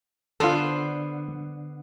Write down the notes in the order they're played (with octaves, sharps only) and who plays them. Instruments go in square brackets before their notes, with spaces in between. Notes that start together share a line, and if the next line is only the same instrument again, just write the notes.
[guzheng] D3 B3 C5 [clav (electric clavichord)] F4 A4